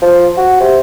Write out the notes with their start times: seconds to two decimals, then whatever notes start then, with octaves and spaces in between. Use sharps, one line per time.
0.02 F3
0.37 F#4
0.60 C3